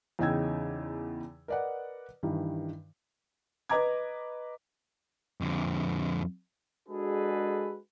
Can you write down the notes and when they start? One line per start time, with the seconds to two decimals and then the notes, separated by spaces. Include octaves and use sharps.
0.19 E2 C#3 D#4 G5 E6 G#6
1.48 A#4 B4 D5 D#5 F#5
2.23 G2 D#3 E3
3.69 B4 D#5 A#5 D6 G#6
5.41 F2 D3
6.88 G#3 D4 F#4 G#4 A4 B4